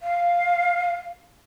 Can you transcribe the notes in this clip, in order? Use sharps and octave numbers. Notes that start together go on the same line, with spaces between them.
F5